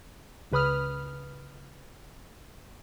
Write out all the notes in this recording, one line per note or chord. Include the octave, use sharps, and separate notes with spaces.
C#2 C#3 B4 B5 D#6 F6